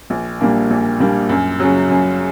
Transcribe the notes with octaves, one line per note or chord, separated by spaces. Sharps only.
A#1
A#2 G3 A#3 D4
A#1
A#2 G3 A#3 D4
F#2
C#3 F#3
F#2